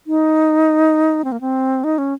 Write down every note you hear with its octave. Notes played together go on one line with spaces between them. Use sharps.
D#4
C4
A#3
C4
D#4
C#4